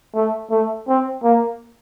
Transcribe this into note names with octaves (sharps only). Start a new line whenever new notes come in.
A3
A3
C4
A#3